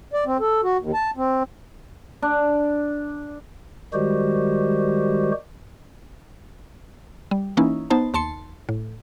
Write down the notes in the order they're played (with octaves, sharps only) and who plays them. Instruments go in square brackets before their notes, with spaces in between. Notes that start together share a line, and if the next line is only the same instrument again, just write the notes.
[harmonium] D5
C4
A4
F#4
D#2
A5
C4
[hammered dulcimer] D4
[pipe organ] D#3 G3 G#3 F#4 G4 C5
[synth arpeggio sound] G3
E3 A#3 C#4 D#4 E4
B3 D#4 C5 A5
D#2 A5 C6 C#7
A2